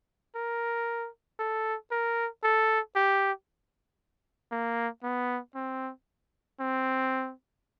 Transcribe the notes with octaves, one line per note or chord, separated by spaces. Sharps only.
A#4
A4
A#4
A4
G4
A#3
B3
C4
C4